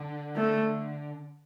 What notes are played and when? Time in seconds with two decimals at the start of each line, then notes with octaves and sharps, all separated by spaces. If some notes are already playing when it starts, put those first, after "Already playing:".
Already playing: D3
0.36 A3